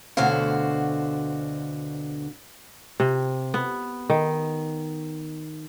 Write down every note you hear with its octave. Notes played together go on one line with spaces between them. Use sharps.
D2 B2 D3 F#4 C5 F5
C3
B3
D#3